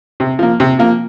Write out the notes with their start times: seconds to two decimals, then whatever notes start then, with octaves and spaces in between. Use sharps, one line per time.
0.20 C3
0.39 F3 A#3
0.60 C3
0.79 F3 A#3